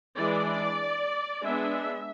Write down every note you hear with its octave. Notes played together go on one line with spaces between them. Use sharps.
E3 G#3 D4 D5
G#3 B3 D4 E5